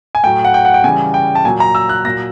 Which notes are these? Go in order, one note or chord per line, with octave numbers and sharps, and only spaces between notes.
G#5
A2 F#3 G5
F#5
G5
F#5
G5
C#3 E3 G3 G#5
G5
A5
A#2 F#3 G#5
A#5
E6
F#6
A#2 F#3 A#6